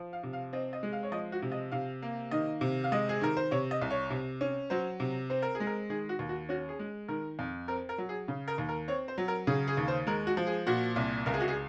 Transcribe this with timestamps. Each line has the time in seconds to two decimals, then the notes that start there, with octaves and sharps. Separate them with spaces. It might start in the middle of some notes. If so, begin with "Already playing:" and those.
Already playing: F3
0.13 F5
0.23 C3
0.33 F5
0.53 C4 D#5
0.73 D#5
0.83 G#3
0.92 F5
1.03 C#5
1.12 F3 D#5
1.32 F#4
1.42 C3
1.52 D#5
1.72 C3 F5
2.02 A#3
2.31 D#3 D#5
2.61 C3
2.84 F5
2.92 G#3 D#5
3.09 G#4
3.21 D#3 A#4
3.37 C5
3.51 C3 C#5
3.71 D#5
3.82 C2
3.91 C#5
4.10 C3
4.41 C#4
4.70 F#3 C5
5.00 C3
5.30 C4 C5
5.42 A#4
5.55 G#4
5.60 G#3
5.67 A#4
5.89 D#3 G#4
6.09 F#4
6.19 D#2
6.29 F#4
6.49 C#4 F#4
6.69 G#4
6.79 G#3
7.08 D#3 A#4
7.39 F2
7.68 C4 A#4
7.89 A#4
7.98 F#3
8.09 G#4
8.28 C#3
8.48 A#4
8.58 D#2
8.69 A#4
8.88 C4 C#5
9.08 C5
9.18 F#3
9.28 A#4
9.47 C#3 G#4
9.68 G#4
9.77 D#2
9.88 C5
10.07 G#3 A#4
10.27 F#4
10.37 F3
10.47 G#4
10.67 A#2 F#4
10.96 C2
11.26 C#2 A#4
11.34 G#4
11.40 F#4
11.48 G#4